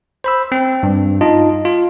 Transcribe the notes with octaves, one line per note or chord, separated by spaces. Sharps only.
C5 B5 E6
C4
G2
D#4 F4 D#5 A5
F4